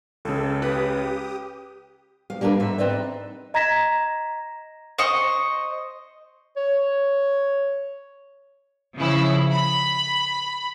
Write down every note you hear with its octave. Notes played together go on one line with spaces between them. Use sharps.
C#2 C#3 A4
G4 B4 D#6
D2 F5
G3 A#3 D4 A#4 B4
G#2 E5
C4 D#4 B4 D5 E5
D#5 A#5 G#6 A#6 B6 E7
C5 D#5 C#6
C#5
C#3 F3 E4
B5